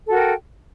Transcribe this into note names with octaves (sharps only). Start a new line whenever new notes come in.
F#4 A4 A#4 G5